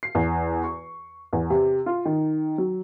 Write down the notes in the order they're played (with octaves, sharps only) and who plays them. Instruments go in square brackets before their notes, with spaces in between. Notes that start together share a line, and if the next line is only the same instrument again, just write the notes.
[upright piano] C7
E2
C#6
E2
C3
F4
D#3
F#3